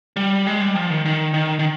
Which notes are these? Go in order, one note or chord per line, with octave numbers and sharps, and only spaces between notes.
G3
G#3
G3
F3
D#3
D#3
D#3
D#3